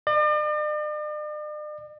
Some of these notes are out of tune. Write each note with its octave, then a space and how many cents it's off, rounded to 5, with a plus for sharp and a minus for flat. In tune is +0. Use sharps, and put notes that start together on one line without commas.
D5 +45